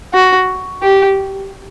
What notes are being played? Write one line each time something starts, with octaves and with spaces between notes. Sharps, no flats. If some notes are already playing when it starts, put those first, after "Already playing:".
F#4
G4